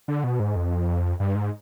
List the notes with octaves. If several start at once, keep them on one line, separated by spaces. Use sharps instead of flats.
D3
B2
G#2
F2
G2
G#2